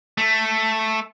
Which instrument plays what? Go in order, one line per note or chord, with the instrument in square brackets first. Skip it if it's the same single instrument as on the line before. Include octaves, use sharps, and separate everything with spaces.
[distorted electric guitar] A3